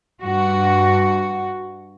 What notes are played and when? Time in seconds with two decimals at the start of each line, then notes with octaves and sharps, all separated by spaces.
0.21 G2 F#4